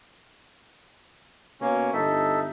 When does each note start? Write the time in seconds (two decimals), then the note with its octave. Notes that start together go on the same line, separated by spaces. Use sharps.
1.61 B2 A#3 C#4
1.93 G1 D#4 A4 E5